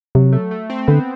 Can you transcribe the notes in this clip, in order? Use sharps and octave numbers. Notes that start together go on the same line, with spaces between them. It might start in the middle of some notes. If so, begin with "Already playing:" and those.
C3 F#3
A3
A3
C4
D3 B3